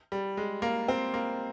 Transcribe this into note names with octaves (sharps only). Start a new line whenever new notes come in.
G3
G#3
A#3
C4
A#3